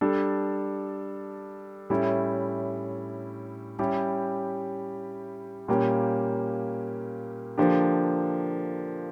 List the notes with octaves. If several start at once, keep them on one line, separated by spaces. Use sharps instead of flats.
G3 D4 A4
A2 G3 C#4 E4
G3 C#4 E4 G4
A#2 G3 A#3 C#4 G4
D3 F3 A#3 D4 G4